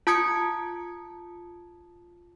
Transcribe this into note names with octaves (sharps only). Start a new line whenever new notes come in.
F4 A5 D#6 G#6 C#7